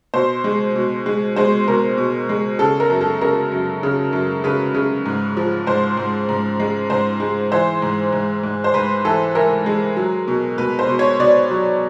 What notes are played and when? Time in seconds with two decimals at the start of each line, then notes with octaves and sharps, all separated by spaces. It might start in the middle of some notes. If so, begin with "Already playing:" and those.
0.14 B2 C5
0.44 G#3
0.75 B2
1.06 G#3
1.36 G#3 C5
1.68 B2 A#4
1.98 B2
2.29 G#3
2.59 C#3 A4
2.80 A#4
2.90 F#2
3.01 A4
3.21 C#3 A#4
3.52 F#2
3.83 C#3
4.13 F#2
4.44 C#3 B4
4.74 C#3
5.05 G#2
5.37 F3
5.67 G#2 C5
5.97 G#2
6.29 G#2
6.60 G#3
6.90 G#2 C5
7.20 G#3
7.52 E3 C5
7.82 G#2
8.12 G#2
8.43 G#2
8.64 C5
8.74 G#2 B4
9.04 E3 A4
9.35 E3 A#4
9.66 G#3
9.97 F#3
10.28 B2
10.58 B2 B4
10.79 C5
10.89 B2
10.99 C#5
11.20 B2 D5
11.51 F#3